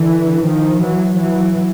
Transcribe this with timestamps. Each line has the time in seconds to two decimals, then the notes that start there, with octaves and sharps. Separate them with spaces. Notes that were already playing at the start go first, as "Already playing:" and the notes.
Already playing: D3 E3
0.44 D#3 F3
0.82 E3 F#3
1.19 E3 F#3